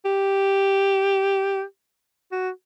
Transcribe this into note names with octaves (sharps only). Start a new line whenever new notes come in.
G4
F#4